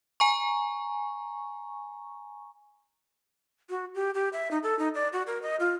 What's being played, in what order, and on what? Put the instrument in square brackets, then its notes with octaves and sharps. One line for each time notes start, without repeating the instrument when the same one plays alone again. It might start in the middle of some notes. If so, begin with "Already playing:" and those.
[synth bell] G#5 A#5 C#6
[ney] F#4
G4
G4
E5
D#4
A4
D#4
D5
F#4
A#4
D#5
F4